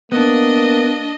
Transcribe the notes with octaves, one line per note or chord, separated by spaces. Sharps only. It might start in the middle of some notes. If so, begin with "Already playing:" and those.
A#3 B3 D4 D#5